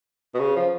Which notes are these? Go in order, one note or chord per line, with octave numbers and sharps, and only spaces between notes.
B2
C#3
F3